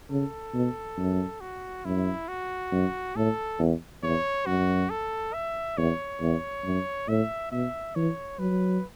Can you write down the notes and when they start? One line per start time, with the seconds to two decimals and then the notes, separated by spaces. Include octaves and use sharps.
0.10 C#3 A4
0.54 B2
0.97 F#2
1.41 F#4
1.85 F#2 E4
2.28 F#4
2.72 F#2
3.16 A2 A4
3.59 E2
4.03 E2 C#5
4.47 F#2 F#4
4.90 A4
5.34 E5
5.77 E2 C#5
6.21 E2
6.65 F#2
7.08 A2 E5
7.52 B2 E5
7.95 E3 C#5
8.39 F#3 B4